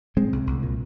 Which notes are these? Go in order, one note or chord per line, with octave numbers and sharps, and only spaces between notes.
A#2 G#3 C4
C2
C2
A#2